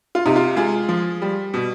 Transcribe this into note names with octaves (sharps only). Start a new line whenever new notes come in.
F4
C3 D#4
F4
G#3 F4 G#4
F3
G3
B2